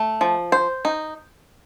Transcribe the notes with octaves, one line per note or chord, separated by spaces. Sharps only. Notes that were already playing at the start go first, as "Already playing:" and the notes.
Already playing: A3
F3
C5
D#4